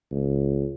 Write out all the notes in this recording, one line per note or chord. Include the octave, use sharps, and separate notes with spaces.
C#2